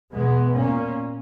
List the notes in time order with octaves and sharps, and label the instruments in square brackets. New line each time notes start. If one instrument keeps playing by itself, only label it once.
[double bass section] E2 B2 G#3 B3
A#2 A#3 C#4